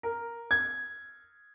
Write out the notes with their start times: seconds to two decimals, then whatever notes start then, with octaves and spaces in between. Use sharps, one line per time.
0.03 A#4
0.51 G#6